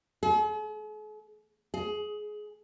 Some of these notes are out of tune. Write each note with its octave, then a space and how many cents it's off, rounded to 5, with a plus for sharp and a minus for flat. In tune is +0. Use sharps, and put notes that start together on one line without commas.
G#4 +45
G#4 +20